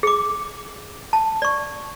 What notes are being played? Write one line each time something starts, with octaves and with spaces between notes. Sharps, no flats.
G#4 D6
A5
D5 C#6